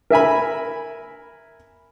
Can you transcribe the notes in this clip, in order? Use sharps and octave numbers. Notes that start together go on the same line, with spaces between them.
A#4 E5 G#5 B5